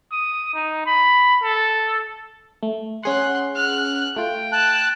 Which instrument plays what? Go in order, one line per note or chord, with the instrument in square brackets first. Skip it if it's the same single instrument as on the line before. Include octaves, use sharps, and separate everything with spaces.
[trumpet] D#6
D#4
B5
A4
[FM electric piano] A3
[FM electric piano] C#4 G#4 F#5 [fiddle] C6 F#6
[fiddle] F6 F#6
[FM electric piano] A3 F4 [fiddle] G5
[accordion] A5 F#6